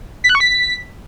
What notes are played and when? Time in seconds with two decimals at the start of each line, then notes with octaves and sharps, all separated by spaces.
0.24 B6
0.29 F#6
0.35 C#6
0.40 B6